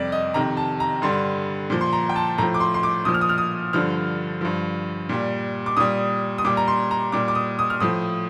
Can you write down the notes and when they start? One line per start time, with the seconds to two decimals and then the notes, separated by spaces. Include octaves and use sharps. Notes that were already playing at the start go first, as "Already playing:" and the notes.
Already playing: F2 C3 G3 D5
0.12 D#5
0.34 F2 C3 D#3 A#5
0.57 A5
0.80 A#5
1.02 G2 D3 G3 C6
1.70 A#2 F3
1.81 C6
1.93 A#5
2.09 G5
2.16 A5
2.38 A2 F3 A#5
2.54 D6
2.60 C6
2.74 C6
2.83 D6
3.05 A#2 F3 D#6
3.14 F6
3.21 D#6
3.29 F6
3.38 D#6
3.73 G2 D3 F3 F6
4.41 G2 F3
5.09 A#2 G3
5.66 D6
5.77 A#2 G3 D#6
6.38 D#6
6.44 A#2 G3 D6
6.57 A#5
6.68 C6
6.91 A#5
7.12 A#2 G3 D6
7.28 D6
7.35 D#6
7.59 D#6
7.70 F6
7.80 A2 F3 D#6